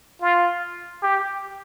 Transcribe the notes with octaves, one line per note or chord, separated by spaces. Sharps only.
F4
G4